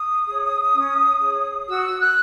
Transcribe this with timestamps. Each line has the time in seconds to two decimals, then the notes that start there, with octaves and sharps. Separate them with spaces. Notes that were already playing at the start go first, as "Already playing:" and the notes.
Already playing: D#6
0.26 G#4 C#5
0.73 C#4
1.20 G#4 C#5
1.68 F#4 E6
1.99 F#6